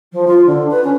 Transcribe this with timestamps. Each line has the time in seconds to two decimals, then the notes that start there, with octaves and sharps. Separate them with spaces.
0.12 F3
0.27 F4
0.46 D3
0.70 B4
0.84 C#4